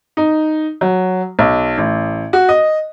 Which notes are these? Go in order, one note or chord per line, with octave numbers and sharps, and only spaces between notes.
D#4
F#3
B1
A1
F#4
D#5